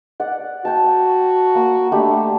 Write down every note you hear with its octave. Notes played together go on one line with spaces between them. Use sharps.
D5 F#5
F#4 G5 A5
A#3
D3 A3 G4 B5